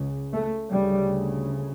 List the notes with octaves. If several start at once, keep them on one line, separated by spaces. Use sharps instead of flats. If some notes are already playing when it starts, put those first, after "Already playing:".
Already playing: C#2 C#3
A3
D2 C#3 G3